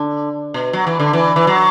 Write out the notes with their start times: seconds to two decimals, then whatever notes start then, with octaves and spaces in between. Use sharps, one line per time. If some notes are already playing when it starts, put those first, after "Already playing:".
Already playing: D3
0.54 B2
0.73 F#3
0.87 E3
1.00 D3
1.13 E3
1.36 E3
1.47 F#3